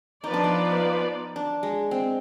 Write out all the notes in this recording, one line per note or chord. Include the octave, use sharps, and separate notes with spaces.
F3 B3 D#4 F4 B4 D5
D4
D#4
D4
G#3
C4